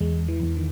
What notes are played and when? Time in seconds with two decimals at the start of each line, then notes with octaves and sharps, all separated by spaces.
0.01 E2 G#3
0.28 E3
0.43 E2
0.57 D#3